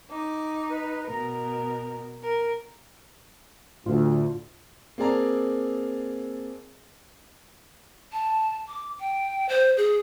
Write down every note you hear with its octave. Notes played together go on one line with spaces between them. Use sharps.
D#4 D6
B4
B2 A#4 A#5
A#4
D2 A2 F4
A#3 C4 G#4 D5 A5 A#5
A5
D6
G5
C5
G#4